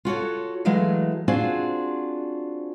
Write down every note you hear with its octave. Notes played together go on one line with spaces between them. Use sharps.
F4 F#4 A4 C#5
E3 F#3 G#3 A3 F5
C4 D4 F4 F#4 G#4